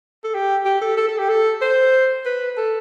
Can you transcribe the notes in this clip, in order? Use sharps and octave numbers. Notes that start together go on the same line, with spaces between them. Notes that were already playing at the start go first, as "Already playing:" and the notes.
A4
G4
G4
A4
A4
A4
G4
A4
C5
B4
A4